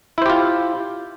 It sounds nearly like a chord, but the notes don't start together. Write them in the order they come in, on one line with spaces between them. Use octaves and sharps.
E4 C5 G4 F4